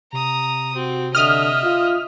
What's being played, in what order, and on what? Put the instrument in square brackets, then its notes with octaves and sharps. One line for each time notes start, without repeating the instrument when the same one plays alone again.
[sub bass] C3 [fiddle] A#5 D#6
[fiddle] C4 [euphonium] F#4
[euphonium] D3 [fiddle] D#5 E5 [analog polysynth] D#6 F6
[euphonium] F4